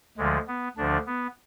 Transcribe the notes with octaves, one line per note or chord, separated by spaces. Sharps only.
D2 D3 F3 G#3
B3
D2 D3 F3 D4
B3